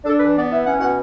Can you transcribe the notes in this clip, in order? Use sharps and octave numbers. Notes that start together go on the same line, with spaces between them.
D4 A4
E3 B4
B3 D5
E3 E5
C#4 F#5
B2 F#5